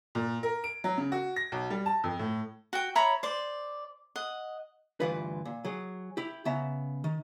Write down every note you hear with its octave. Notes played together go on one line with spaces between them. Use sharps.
A#2
A#4
D7
F#3
C#3
F#4
A#6
B1
G3
A5
F2
A2
F#4 G5
C#5 E5 A#5 B5
C5 D5
D#5 F#5
D2 G2 E3 F4 B4
A#2
F#3 G#4
E4 G4
C#3 B3 E5 A#5
D#3